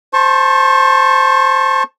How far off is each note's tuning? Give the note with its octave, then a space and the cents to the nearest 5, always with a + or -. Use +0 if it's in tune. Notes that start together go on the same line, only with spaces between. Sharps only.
C5 +0 A5 +0 C#6 -30